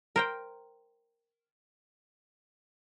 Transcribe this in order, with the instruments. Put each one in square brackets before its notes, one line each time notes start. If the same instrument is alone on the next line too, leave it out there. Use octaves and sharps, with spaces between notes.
[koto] A#4 C5 G5